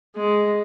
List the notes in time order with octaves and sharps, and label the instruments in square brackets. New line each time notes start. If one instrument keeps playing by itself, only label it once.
[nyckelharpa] G#3